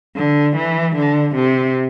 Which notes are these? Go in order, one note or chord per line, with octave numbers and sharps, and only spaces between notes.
D3
E3
D3
C3